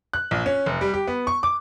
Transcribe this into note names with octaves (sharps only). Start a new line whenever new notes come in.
F#6
A#1
C#4
F1
G3
G4
B3
C#6
D6